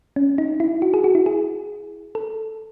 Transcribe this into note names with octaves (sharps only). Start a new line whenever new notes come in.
C#4
D#4
E4
F#4
G#4
F#4
E4
G#4
A4